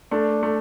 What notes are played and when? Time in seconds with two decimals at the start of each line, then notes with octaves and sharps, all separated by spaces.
0.11 A3 D4
0.43 A3